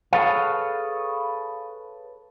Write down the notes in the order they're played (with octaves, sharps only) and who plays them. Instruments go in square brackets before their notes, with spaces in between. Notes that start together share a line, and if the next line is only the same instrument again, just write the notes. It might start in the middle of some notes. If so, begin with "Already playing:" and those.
[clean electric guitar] G#4 A4 B4 C#5 F5